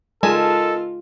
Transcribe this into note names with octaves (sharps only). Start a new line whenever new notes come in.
G#3 F4 A4 A#4 D#5 G#5 A5